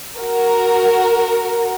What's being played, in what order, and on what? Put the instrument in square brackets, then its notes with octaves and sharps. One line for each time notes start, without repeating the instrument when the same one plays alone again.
[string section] F#4 A#4